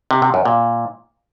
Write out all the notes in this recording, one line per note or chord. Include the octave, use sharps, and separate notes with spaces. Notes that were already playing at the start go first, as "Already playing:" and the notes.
C3
C3
F#2
A#2